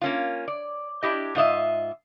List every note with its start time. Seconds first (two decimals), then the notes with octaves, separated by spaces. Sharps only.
0.02 A#3 C#4 F4
0.48 D5
1.03 D4 E4 G4 D#5
1.35 G#2 F4 D#5 E5